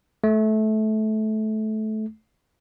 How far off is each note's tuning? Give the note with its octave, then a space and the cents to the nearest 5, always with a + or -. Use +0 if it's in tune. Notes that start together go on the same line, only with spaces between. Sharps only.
A3 -20